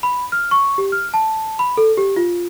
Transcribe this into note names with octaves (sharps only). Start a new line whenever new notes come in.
B5
F6
C#6
G4
F6
A5
B5
A4
G4
F4